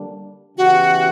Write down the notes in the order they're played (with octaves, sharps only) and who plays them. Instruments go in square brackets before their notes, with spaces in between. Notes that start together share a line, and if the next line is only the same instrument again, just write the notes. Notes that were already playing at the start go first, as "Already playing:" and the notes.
Already playing: [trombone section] D3 G3 A#3 D4
[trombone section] C#3 E3 B3 E4 G4 [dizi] F#4